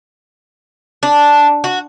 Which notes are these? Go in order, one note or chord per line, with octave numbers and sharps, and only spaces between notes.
D4
F#4